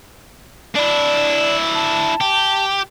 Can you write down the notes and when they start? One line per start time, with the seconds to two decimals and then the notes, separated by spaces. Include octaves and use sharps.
0.76 D4 E4 D5
1.75 A5
2.21 G4